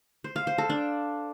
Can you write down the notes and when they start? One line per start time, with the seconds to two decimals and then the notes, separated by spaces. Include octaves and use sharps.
0.24 C5
0.36 F5
0.47 C5
0.58 A4
0.70 D4